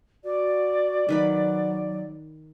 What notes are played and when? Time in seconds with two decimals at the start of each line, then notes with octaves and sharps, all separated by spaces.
0.24 F#4 D5
1.09 D#3 F#3 B4 B5